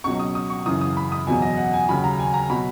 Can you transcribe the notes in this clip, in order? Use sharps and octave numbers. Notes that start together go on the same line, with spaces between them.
C#2 B2 F#3 C#6
D#6
D#6
C#6
F#2 C#3 E3 D#6
D#6
B5
D#6
E2 B2 F#3 G#5
D#5
F#5
G#5
D#2 C#3 F#3 B5
A#5
G#5
A#5
B2 F#3 B5